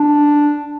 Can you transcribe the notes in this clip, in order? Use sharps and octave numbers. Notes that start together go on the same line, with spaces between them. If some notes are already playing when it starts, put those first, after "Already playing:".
Already playing: D4